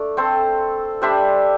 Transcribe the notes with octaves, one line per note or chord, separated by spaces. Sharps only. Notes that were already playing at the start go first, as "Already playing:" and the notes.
Already playing: A3 D4
C4 A4 C5
G3 D4 C5 E5